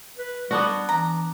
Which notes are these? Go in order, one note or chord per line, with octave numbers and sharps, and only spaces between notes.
B4
G3 B3 D4 F#4
E3 A#5